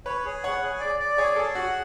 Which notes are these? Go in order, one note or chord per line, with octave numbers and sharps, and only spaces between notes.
B4 C#5
G#4
C#5 F#5
G#4
D5
D5
G#4 C#5
G#4 A4
F#4 F#5